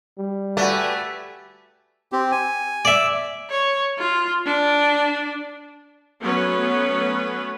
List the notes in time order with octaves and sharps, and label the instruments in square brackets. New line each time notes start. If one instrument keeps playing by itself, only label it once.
[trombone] G3
[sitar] A3 [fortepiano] F#4 D5 [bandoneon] G4 B4 G#5
[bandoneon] C4 G4
G#5
[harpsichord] D5 E5
[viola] C#5
F4
D4
[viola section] F#3 A3 B3 C#4 B4